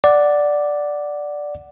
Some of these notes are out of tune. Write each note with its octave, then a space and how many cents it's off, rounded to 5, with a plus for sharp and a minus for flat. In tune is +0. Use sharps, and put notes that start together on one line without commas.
D5 +0 F#5 +0